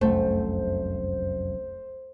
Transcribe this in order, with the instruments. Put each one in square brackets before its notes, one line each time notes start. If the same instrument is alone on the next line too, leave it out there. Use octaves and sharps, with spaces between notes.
[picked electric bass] F1 C2 F#2 [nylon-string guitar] A3 [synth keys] C5